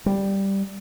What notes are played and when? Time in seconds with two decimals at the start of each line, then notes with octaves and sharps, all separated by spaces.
0.06 G3